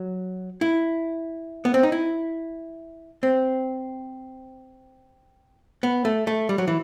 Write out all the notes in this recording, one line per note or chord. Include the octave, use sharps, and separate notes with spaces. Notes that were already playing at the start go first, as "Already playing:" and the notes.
Already playing: F#3
E4
B3
C4
D#4
E4
C4
B3
A3
A3
G3
F#3
E3